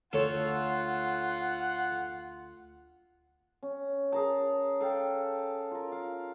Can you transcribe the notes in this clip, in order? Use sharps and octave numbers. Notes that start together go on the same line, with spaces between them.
D2 F4 A4 C#5 F#5
C#4
G#4 A#4 A5
A4 F5 G5 A5
F4 A#4
F5